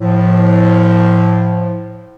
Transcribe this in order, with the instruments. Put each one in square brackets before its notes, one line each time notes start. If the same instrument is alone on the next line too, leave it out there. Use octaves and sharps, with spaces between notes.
[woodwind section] A2 F3